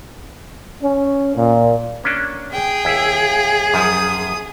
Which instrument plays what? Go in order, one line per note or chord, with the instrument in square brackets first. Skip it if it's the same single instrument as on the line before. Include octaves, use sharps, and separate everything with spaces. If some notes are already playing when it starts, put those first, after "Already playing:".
[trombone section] C#4
A#2
[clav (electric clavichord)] A#3 C#4 D4
[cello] G#4 [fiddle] G5
[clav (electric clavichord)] D#2 E4
[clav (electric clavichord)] F#2 F3 [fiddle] D#6